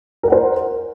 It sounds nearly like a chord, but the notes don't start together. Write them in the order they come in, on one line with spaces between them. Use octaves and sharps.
A#4 F#5 C5